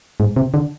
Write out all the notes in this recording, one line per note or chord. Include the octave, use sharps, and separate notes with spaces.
G#2
C3
D3